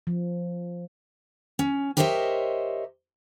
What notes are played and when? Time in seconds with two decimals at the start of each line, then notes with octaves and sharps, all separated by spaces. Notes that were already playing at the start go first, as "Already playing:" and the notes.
0.07 F3
1.59 C#4
1.97 G4 A#4 C5 C#5 D#5 E5